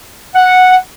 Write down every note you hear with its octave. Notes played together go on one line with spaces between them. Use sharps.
F#5